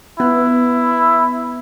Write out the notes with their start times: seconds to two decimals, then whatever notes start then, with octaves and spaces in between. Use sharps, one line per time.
0.19 B3 E4